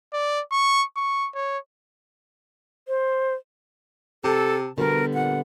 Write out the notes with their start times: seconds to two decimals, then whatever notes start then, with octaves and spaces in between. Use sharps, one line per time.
0.13 D5
0.52 C#6
0.96 C#6
1.34 C#5
2.88 C5
4.24 C3 A4 A5
4.78 B2 D3 G3 B3 A#4
5.14 A#2 F#5